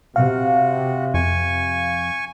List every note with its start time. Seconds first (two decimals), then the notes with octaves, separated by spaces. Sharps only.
0.16 C3 F#4 F5
1.14 F2 G#5 C#6